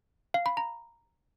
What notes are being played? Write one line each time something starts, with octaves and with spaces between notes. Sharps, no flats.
F5
B5
A#5